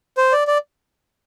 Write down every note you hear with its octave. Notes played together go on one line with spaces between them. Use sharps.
C5
D5
D5